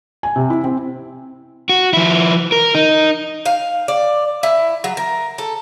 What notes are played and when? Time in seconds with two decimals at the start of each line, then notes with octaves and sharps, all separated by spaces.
0.23 G#5
0.36 C3
0.50 E4
0.64 C4
1.69 F#4
1.93 F3 E4
2.52 A#4
2.75 D#4
3.46 F5
3.88 D5
4.43 E4
4.84 F#3
4.97 A#4
5.38 A4